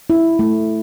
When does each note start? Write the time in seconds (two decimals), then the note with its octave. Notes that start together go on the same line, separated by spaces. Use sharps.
0.10 E4
0.39 A3